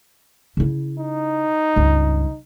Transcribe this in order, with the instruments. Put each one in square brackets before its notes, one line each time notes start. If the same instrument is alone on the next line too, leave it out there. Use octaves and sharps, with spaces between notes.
[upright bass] C#3 E4
[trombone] D#4
[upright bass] C#2 G2